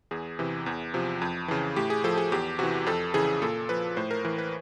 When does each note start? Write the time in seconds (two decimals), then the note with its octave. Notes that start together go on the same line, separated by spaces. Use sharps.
0.11 E2 G#4
0.39 C3 E3
0.66 E2
0.94 C3 F3
1.22 F2
1.48 C#3 E3
1.76 A2 G4
1.90 G#4
2.04 F3 A4
2.17 G#4
2.32 E2 G4
2.59 C3 E3 F#4
2.86 F2 A4
3.14 C#3 E3 G#4
3.42 A#2 A4
3.69 F3 B4
3.97 A2 C5
4.11 A#4
4.25 E3 A#4
4.38 B4